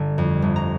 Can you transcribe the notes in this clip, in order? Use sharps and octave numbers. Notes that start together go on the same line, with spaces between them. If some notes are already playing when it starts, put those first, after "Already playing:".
Already playing: G1 D3
F2
G1
A#5